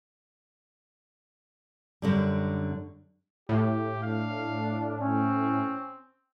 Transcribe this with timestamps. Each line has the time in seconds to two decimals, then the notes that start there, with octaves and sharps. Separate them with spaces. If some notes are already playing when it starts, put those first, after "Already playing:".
2.02 F#2 D3 G3
3.49 A2 G4
4.03 D4 F5
5.00 C4 C#4